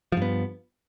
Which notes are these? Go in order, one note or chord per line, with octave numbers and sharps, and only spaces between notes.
G2 F3 B3